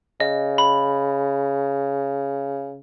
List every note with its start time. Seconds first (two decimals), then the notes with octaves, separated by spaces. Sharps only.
0.20 C#3 D#5
0.58 B5